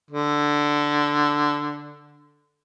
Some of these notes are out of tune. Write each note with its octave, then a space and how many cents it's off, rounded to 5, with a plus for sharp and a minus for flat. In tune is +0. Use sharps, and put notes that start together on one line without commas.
D3 +0